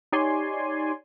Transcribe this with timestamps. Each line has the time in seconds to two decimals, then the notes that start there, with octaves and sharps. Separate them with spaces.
0.12 D#4 G4 C#5 D5 G#5 C6